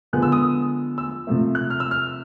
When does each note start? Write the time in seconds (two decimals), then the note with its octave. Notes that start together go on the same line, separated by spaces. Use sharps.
0.13 D3 F3 G#3 B3 F#6
0.23 E6
0.32 D#6
0.98 E6
1.27 C3 F3 A3
1.55 F#6
1.70 F6
1.80 E6
1.91 F6